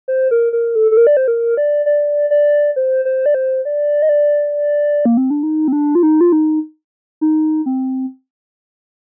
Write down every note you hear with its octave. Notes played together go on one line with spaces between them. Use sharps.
C5
A#4
A#4
A4
A4
A#4
D5
C5
A#4
D5
D5
D5
C5
C5
D5
C5
D5
D#5
D5
A#3
C4
D4
D#4
C4
D4
F4
D#4
F4
D#4
D#4
C4